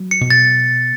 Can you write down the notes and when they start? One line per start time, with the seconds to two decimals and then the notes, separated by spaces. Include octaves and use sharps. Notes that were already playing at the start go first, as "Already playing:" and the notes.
Already playing: F#3
0.11 C#7
0.21 B2
0.30 A6